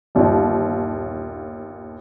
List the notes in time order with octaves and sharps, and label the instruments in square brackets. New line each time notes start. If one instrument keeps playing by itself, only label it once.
[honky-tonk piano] G1 D#2 A#2